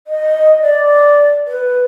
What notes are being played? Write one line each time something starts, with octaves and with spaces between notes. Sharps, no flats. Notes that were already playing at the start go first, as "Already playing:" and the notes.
D#5
D5
B4